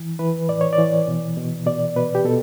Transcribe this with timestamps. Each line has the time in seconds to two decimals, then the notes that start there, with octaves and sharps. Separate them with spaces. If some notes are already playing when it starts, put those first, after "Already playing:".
Already playing: E3
0.19 E3 B4
0.49 A2 D5
0.61 C#5
0.73 D5
0.78 E3
1.08 B2
1.37 B2
1.66 B2 D5
1.96 B2 B4
2.15 G4
2.25 B2 A4